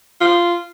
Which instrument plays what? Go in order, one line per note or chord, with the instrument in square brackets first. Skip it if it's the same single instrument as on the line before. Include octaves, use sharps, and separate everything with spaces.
[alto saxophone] F4